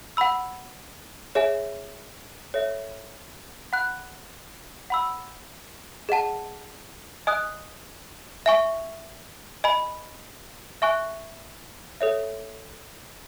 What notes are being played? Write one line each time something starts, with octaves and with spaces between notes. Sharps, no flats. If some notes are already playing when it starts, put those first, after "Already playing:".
F#5 B5 E6
G#4 C#5 E5 G#5
A4 C#5 E5
F#5 B5 F#6
F#5 B5 E6
G#4 D#5 F#5 A5
D#5 G#5 D#6 F#6
E5 G#5 C#6
D#5 G#5 B5
E5 G#5 C#6 F#6
A4 C#5 E5